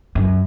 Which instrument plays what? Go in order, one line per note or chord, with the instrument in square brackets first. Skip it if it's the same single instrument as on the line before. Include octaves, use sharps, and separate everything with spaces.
[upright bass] F#2